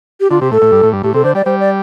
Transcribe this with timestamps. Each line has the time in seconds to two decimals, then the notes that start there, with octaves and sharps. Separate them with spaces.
0.20 G4
0.30 D3 F4
0.41 C3 G4
0.51 A2 A4
0.62 A2
0.72 G2
0.83 A2
0.93 G2
1.04 A2 G4
1.14 C3 A4
1.24 D3 C5
1.35 G3 D5
1.45 G3 C5
1.60 D5